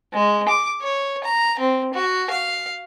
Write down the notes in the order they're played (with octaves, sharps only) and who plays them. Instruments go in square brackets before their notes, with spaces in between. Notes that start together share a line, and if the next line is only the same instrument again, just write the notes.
[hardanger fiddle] G#3
D6
C#5
A#5
C4
F#4
F5